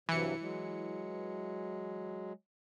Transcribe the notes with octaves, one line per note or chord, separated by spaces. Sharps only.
G2 C3 E3 F#3 C#7
F#3 G#3